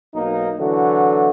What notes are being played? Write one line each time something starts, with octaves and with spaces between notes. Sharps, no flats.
B1 A#3 D#4
D3 E3 F#3 A3 F#4